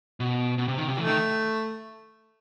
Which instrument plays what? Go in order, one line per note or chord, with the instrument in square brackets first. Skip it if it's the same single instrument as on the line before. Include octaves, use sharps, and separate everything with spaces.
[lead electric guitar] B2
B2
C3
D#3
C3
[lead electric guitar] E3 [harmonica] A3
[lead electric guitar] D#3